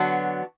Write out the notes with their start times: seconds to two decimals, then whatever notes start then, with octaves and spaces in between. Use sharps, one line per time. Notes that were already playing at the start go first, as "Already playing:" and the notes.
Already playing: D3 F#3 B3 D4 F#4